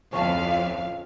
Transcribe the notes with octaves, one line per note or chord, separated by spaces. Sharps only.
D1 F2 C#4 F5 A5